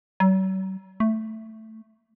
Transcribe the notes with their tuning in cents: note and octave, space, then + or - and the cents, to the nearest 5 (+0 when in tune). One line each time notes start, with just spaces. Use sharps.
F#3 +45
A3 +5